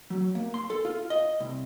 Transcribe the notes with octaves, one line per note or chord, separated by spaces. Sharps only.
F#3
A#3
C6
A4
F4
D#5
C2